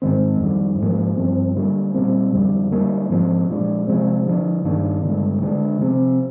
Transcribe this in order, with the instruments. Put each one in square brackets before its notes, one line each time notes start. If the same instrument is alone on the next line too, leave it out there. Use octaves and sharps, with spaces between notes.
[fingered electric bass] G#2 D#3 G#3 C4
F2 D#3 G3
G#2 F3 A#3
G2 F3 C4
D3 G3 A#3
A#2 G3 C4
F2 D3 G3
D3 G3 A#3
G#2 F3 C4
A#2 F3 G#3 D4
C3 F3 G#3 C4
D3 F3 A#3 D4
G2 D#3 A#3 D4
G2 D3 G#3
D3 G#3 D4
C3 F3 C4